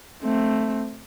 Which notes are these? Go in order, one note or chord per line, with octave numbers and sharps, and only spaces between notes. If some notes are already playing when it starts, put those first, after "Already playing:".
A3 C4